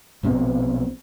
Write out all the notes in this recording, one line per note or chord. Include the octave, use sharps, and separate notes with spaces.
A#1 B2 D#3 C4